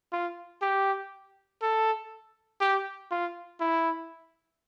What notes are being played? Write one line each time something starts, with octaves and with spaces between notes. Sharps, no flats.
F4
G4
A4
G4
F4
E4